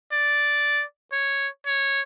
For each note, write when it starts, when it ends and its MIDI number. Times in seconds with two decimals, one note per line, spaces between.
0.13 0.83 74
1.13 1.47 73
1.67 2.00 73